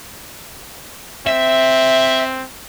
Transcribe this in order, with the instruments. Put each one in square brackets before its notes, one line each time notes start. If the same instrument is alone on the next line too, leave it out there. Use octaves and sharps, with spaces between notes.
[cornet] C4 [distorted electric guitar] E5